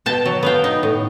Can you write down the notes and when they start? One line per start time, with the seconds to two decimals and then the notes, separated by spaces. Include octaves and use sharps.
0.06 B2 G5 A5
0.25 F#3
0.43 B3 F5 G5
0.64 D#4
0.83 A2